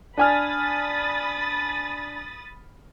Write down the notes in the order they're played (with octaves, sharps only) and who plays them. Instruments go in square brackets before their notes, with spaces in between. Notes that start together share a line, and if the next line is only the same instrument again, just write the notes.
[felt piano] D4 G#5 F6 [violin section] B5 D#6 A6